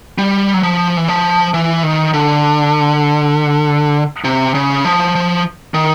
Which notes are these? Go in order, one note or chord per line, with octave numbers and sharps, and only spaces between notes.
G3
F#3
F3
E3
F3
E3
D#3
D3
C3
C#3
F3
F3
D#3